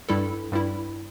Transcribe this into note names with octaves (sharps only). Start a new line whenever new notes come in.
G2 G3 E4 A4
G2 G3 E4